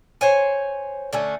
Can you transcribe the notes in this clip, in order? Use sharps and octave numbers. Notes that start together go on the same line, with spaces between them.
C5 C#5 G#5
D3 A3 C#4